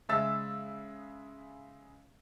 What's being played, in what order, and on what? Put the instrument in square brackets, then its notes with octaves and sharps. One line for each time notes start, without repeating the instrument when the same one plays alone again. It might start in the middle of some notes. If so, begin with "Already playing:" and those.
[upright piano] C#3 G#3 E5 E6 A6